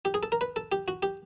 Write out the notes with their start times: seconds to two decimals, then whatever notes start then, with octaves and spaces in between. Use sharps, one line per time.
0.05 G4
0.14 G#4
0.23 A4
0.32 A#4
0.41 B4
0.56 A4
0.72 G4
0.88 F#4
1.03 G4